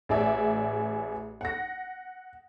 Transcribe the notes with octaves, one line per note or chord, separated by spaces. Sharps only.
A1 G#4 D5 E5
F#5 A#6